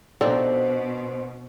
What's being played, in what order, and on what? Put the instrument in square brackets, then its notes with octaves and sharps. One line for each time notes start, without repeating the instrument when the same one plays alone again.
[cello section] B2 [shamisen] F3 A4 D5 [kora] C4 D4 D#4 [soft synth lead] C5